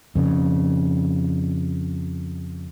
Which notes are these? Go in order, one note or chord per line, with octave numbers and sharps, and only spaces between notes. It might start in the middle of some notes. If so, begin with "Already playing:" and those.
F2 C#3